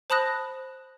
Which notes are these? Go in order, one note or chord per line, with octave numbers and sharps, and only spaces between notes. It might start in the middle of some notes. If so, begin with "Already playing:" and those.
C5 A5 B5 D#6 F#6 A#6